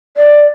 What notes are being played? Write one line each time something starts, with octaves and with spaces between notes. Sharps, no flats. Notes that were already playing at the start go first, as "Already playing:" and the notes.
D5